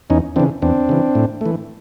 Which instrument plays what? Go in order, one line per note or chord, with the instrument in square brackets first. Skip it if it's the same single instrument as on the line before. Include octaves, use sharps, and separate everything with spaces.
[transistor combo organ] E2 C#4 D#4
E3 C4 D4
C#3
E2 C4 D4
C#3 E3
A2
E3 A3